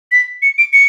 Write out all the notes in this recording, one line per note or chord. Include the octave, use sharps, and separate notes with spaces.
B6
C#7
D7
C#7